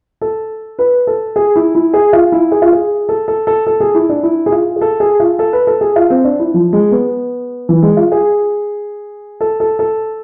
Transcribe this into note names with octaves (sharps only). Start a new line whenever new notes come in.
A4
B4
A4
G#4
E4
E4
G#4
F4
E4
G#4
F4
G#4
A4
A4
A4
A4
G#4
E4
D4
E4
G#4
F4
G#4
A4
G#4
F4
A4
B4
A4
G#4
F4
C4
D4
E4
F3
G#3
B3
E3
G#3
F4
G#4
A4
A4
A4